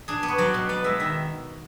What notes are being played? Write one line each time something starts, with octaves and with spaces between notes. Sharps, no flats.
D4 G#4
B3
C#5
F#3 D5
B2
B3 D5
G#3 E5
D#3 E5